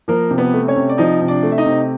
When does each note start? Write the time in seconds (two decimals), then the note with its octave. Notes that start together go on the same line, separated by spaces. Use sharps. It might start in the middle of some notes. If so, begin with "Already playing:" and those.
0.08 F3 A#3 A#4
0.30 C3
0.38 B3 B4
0.53 A3
0.68 C#4 C#5
0.76 C3
0.89 D5
0.98 F3 D#4 D#5
1.22 C3
1.28 D4 D5
1.43 A3
1.52 E5
1.58 D#4 D#5
1.66 C3